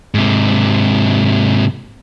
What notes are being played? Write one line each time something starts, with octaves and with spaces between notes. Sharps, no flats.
G#2 C3